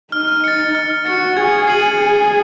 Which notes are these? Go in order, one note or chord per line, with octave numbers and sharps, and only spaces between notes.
D#4 F6
A6 C#7
F6
F#4 A6 C#7
G#4 G#6
C7 D#7 F#7
G#4 G#6